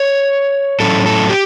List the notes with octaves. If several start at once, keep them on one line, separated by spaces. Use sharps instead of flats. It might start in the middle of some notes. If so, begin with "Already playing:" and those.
Already playing: C#5
A2 F#3 C#4 E4 A4
A4
G4